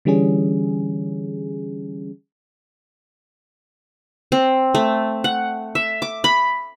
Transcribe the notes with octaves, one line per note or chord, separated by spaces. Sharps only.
D3 E3 G3 C#4 G#4
C4
A3
F#5
E5
D6
B5